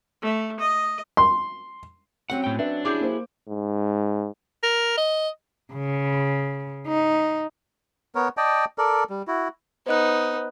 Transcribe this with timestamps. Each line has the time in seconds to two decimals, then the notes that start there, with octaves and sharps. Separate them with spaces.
0.22 A3
0.59 D#5
1.17 C6
2.30 F#3 C4 C#4 F#5
2.44 A2 G5
2.59 D4 B4 E5
2.85 E4 G4 G#4 D6 G6
3.01 A#3 C5
3.48 G#2
4.63 A#4
4.97 D#5
5.73 C#3
6.87 D#4
8.15 B3 A#4 C#5
8.37 D5 D#5 G5 A5
8.78 A4 A#4 D5
9.10 G3
9.28 E4 F#4
9.87 B3 D#4 C5 D#5 F#6